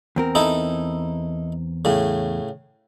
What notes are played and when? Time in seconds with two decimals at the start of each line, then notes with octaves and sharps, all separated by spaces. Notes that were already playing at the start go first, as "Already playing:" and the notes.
0.16 E2 C4 A#4
0.35 D#4 E4 A4
1.85 A2 C#3